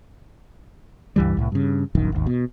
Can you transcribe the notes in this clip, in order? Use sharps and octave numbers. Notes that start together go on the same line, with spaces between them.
C#2 G2 E3 G3
C2 A2
G2 C#3
D#1 A#1 F#2 D#3
G#1 D#2
B2